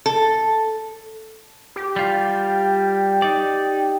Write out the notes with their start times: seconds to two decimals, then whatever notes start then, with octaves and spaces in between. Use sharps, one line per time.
0.06 A4
1.76 G4
1.96 G3 F4
3.22 D#4 D5